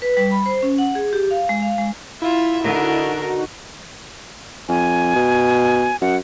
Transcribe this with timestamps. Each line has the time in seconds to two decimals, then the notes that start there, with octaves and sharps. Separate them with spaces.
0.02 B4
0.17 G3
0.31 B5
0.46 C5
0.62 C#4
0.78 F#5
0.95 G#4
1.13 G4
1.31 F5
1.49 G#3
1.62 F5
1.78 G#3
2.22 E4 F4 E5
2.63 D3 D#4 F#4 A#4
4.69 F2 G#5
5.15 B2
6.01 F#2 F#5